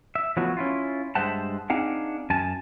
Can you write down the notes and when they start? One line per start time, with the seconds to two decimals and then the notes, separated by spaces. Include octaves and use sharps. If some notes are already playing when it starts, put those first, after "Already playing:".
0.15 E5
0.37 F3 F#3 A3 B3 F#4
0.57 C#4 E4 F4
1.15 G2 G#3 C5 E5 F#5 A5
1.70 C4 D4 D#4 G#4 F5 F#5
2.30 F#2 G#5 A5